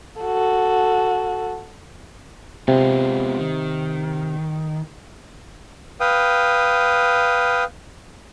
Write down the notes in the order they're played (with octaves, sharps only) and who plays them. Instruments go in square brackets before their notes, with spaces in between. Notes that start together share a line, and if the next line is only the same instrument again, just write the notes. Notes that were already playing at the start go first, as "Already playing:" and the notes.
[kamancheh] F#4 A4
[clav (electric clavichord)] C3 [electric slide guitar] G#3 B3 F4
[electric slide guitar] D#3
[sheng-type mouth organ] B4 F5 G5 D#6